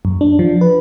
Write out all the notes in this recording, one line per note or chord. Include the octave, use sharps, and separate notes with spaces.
F#2
D4
F3
B4